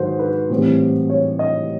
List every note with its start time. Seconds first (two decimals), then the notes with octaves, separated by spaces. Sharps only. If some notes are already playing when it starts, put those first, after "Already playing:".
Already playing: G#2 D#3 F#3 B4 C5
0.19 B4
0.50 A2 E3 G3 C4
1.10 C#5
1.39 D#5